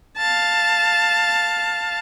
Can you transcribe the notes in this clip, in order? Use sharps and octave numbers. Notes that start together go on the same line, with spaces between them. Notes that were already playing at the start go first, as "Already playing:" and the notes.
F5 A5